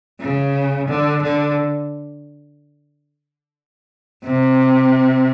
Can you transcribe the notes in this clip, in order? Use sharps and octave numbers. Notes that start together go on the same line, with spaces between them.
C#3
D3
D3
C3